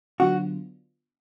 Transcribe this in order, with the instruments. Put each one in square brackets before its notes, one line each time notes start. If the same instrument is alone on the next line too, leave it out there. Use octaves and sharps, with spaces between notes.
[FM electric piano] D3 F#3 B3 D4 F4 [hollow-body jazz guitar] F#4